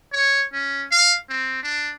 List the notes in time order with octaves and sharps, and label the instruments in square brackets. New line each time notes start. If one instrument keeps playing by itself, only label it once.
[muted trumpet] C#5
C#4
F5
C4
D4